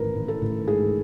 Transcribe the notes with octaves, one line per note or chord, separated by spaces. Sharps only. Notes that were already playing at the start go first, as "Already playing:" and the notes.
Already playing: A1 G#2 D#3 A#4 B4
A1
A4
A1
G#2 G#4